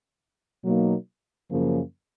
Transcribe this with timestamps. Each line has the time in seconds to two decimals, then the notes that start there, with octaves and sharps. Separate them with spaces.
0.63 B2 F#3 A#3 D#4
1.50 F#2 C#3 F3 A#3 C#4